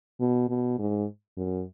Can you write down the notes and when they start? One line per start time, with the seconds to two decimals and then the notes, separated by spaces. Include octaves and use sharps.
0.20 B2
0.49 B2
0.79 G#2
1.37 F#2